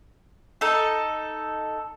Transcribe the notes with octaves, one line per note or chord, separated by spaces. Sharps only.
D#4 A4